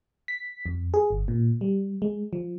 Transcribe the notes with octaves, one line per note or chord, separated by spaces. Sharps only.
B6
F2
G#4
G1
A#2
G3
G#3
F3